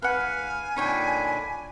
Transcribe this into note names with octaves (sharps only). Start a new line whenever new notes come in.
G#2 B4 F5 F#5 G#5
A#2 D3 D4 D#4 C#5 G5 B5